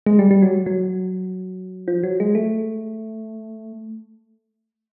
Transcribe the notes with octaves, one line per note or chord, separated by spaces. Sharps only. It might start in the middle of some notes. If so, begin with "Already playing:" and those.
G#3
G3
G3
F#3
F#3
F3
F#3
G#3
A3